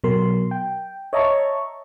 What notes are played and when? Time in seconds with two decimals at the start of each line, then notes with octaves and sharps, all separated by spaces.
0.04 B2 F#3 A#4 C6
0.51 G5
1.13 C#5 D#5 E5 A5 A#5 C#6